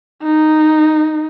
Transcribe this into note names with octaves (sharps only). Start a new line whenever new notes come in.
D#4